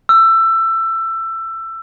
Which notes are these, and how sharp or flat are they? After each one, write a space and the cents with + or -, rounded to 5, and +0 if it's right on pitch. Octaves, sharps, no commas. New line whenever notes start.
E6 +20